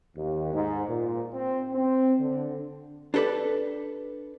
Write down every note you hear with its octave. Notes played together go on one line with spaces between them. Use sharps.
D#2
G#2
A#2
C4
C4
D3
D4 G4 A4 B4 D5